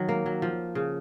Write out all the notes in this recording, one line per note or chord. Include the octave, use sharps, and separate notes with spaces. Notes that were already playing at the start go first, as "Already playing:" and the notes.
Already playing: D#3 F#3
A#3
F#3
F3
C#3